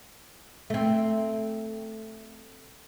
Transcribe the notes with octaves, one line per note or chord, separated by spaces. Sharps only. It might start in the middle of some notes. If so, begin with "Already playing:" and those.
A3 C4